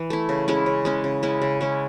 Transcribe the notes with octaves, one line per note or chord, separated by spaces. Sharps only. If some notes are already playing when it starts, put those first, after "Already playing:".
Already playing: E3
A3 E4
C#3
G#3 C#4 E4
C#3
G#3 C#4 E4
C#3
G#3 C#4 E4
C#3
G#3 C#4 E4